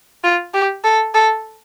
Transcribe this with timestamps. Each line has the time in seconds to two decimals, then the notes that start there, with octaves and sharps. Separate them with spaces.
0.24 F4
0.54 G4
0.84 A4
1.14 A4